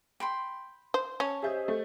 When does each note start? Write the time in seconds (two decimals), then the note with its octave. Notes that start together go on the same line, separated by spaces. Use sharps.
0.20 G5 B5 C6
0.94 C5
1.20 C#4 C#5 A5
1.42 G4 G#4 C5 D#5 E5 G6
1.68 A3